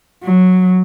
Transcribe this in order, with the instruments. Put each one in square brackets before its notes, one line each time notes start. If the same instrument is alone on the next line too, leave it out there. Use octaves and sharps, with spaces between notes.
[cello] F#3